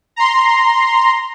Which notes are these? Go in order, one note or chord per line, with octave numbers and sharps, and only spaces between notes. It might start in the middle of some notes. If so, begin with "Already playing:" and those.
A#5 C6